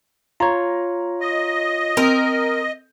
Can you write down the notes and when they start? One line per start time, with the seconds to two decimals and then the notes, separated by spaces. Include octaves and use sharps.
0.40 F4 C#5 A#5
1.21 D#5
1.97 C4 A#4